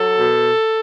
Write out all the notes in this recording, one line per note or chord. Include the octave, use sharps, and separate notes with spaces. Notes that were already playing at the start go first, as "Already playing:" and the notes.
Already playing: F#3 A4
B2